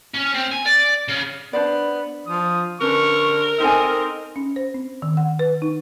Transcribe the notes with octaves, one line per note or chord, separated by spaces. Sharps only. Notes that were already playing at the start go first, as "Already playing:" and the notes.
C#4
C4
G#5
D5
C#3
B3 D4 C5 D5
F3 D#6
D3 C#4 A#4 B4 C#6
C4 D#4 A4 D#5 G#5
C#4
C5
C4
D#3
F#5
B4
D#4